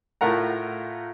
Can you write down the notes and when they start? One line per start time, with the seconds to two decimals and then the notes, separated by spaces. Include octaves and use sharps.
0.21 A2 A3 F4 A#4 F#5 A#5